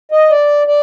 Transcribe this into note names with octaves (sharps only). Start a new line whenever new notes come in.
D#5
D5
D5